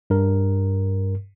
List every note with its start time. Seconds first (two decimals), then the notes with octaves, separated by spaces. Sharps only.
0.10 G2 A#4